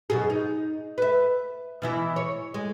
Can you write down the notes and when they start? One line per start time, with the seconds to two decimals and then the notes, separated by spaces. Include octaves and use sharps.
0.10 F#2 B2 G#4
0.30 D#4
0.98 B4 E5
1.82 B2 E3 E4
2.16 C#5
2.54 G#3